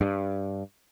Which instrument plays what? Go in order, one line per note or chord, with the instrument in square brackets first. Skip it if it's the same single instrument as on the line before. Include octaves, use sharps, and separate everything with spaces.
[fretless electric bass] G2